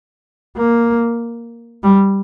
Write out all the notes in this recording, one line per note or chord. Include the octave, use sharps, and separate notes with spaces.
A#3
G3